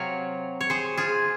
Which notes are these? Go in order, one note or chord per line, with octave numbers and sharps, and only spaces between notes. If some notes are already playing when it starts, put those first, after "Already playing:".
Already playing: C3 F#3 C#5 F5
C#5
G#4 C5
F4 G#4